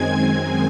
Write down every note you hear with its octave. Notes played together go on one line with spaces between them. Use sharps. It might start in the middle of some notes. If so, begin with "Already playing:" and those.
Already playing: F#2 D#3 G#3 C4 G#5 G#6